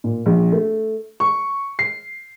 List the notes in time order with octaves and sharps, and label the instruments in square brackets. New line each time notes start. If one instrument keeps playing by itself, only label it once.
[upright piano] A#2
A#1
A3
C#6
C7